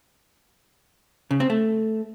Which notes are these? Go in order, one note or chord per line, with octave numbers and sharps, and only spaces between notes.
C#3
C4
A3